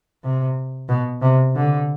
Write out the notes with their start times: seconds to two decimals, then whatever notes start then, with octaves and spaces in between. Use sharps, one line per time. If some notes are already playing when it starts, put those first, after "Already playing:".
0.24 C3
0.89 B2
1.22 C3
1.56 D3